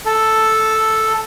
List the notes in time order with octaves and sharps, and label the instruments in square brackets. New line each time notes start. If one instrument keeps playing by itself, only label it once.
[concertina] A4